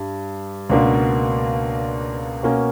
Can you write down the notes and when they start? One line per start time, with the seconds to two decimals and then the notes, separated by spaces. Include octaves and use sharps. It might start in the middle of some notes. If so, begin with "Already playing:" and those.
Already playing: G2 G3
0.70 C#2 B2 A#3 D4
2.43 B2 A#3 C#4